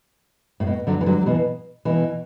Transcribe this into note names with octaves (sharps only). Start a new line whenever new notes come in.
A2
B2
D3 F#3
E3
D3 F#3
F#3
B2 E3
B2 E3